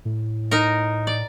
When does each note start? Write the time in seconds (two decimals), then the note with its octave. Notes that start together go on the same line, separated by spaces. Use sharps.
0.05 A2
0.51 D#4 A#4
1.07 D5